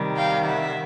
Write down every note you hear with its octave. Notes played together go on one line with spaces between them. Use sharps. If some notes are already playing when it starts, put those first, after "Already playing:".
Already playing: C3 D#3 G3
F5 G5
E5 F#5